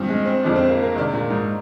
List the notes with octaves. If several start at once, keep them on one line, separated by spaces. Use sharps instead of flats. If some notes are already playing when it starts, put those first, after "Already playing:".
Already playing: G2 F3 C4
G#3
C4
F2 D3 F3 G#3 D4 D#4
C4
A#3
A#3
C3 D#3 G#3 D4
A#2
G#2